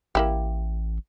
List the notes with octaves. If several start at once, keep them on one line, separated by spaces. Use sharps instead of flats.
A1 A#3 E4 G4